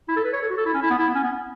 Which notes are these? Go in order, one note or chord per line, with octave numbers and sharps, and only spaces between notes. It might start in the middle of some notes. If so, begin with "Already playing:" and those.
E4
A4
B4
C#5
A4
F#4
A4
E4
C#4
E4
B3
E4
B3
C#4
B3